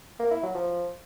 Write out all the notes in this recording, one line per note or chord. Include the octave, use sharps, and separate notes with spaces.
A#3
E4
F#3
F3